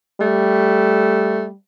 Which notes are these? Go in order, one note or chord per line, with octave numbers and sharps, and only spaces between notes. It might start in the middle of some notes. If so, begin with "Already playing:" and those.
G3 A3